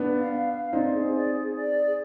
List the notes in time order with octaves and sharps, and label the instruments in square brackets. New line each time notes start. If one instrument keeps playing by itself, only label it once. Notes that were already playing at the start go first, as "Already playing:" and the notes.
Already playing: [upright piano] B3 D4
[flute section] F5
F5
F5
[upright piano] C4 D#4 [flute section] D5
[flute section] G#4
D5
D5
D5
G#4